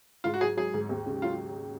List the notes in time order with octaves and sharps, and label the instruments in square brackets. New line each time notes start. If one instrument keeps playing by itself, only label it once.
[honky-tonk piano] G#2 [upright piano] F4
[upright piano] F#4
[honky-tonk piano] F#3 [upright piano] G#4
[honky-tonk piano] F#3 [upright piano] G#4
[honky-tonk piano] G#2
D#2
C#3
[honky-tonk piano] F#3 [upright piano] F4